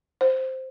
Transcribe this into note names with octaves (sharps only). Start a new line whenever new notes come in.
C5